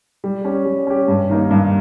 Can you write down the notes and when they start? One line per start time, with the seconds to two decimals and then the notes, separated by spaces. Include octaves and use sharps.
0.24 G3
0.45 C#4 G4
0.66 G3
0.87 C#4 G4
1.08 G2
1.30 D#3 A#3 D#4
1.51 G2